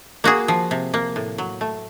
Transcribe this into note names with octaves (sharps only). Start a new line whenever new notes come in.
A#3 F#4 G#4
F3
C3
A#3
A2
F#3
A3